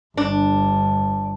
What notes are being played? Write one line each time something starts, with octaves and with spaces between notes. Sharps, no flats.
G1 D4